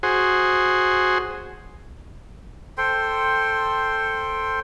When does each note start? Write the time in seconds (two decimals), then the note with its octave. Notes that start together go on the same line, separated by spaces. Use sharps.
0.03 F#4 G#4 C5
2.78 A4 C5 G5 C6